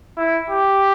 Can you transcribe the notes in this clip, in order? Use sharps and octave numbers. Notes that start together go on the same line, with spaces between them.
E4
G4